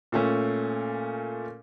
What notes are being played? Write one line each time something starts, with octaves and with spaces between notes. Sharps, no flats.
A#2 A3 C#4